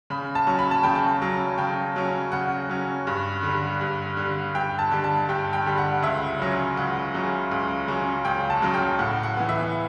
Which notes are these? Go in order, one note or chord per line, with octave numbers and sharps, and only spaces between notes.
C#3 B5
A5
F#3 C#4
B5
A5
C#3 G5
A5
F#3 C#4
C#3 G5
F#3 C#4
C#3 F#5
F#3 C#4
G2
D3 G3
G2
D3 G3
G2 G5
A5
D3 G3
A5
G2 G5
G5
D3 G3
F#5
C#2 E5
C#3 F#3 C#4
C#2 F#5
C#3 F#3 C#4
C#2
C#3 F#3 C#4
C#2 G5
A5
C#3 F#3 C#4
G5
A2 F#5
F#5
E3 B3
E5